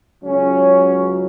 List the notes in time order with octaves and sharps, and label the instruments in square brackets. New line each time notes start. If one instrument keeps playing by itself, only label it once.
[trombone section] C#2 C#3 F#3 C#4